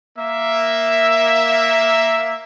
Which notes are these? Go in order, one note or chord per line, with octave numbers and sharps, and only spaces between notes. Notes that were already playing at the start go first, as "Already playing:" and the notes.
A#3 E5